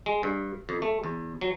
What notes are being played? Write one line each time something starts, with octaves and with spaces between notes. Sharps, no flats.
G#3
G2
F2
A3
E2
F#3